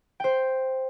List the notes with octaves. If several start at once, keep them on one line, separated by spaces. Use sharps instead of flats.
C5 G5